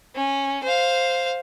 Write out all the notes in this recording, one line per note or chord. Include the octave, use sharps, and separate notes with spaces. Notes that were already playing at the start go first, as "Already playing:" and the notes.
C#4
C5 F5